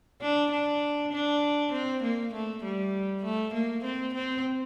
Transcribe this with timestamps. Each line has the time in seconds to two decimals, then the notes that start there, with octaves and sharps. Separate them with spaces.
0.22 D4
0.51 D4
1.13 D4
1.72 C4
2.03 A#3
2.34 A3
2.64 G3
3.24 A3
3.53 A#3
3.84 C4
4.14 C4